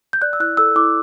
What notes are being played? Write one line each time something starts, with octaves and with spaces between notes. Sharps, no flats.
G6
D5 F#6
E6
E4 F#6
A4 E6
E4 D6